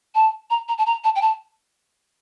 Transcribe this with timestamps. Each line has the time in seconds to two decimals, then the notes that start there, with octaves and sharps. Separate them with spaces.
0.15 A5
0.50 A#5
0.69 A#5
0.78 A5
0.86 A#5
1.04 A5
1.16 G5
1.22 A5